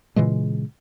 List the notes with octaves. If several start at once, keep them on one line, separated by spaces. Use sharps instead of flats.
A#2 C#3 E3 G#3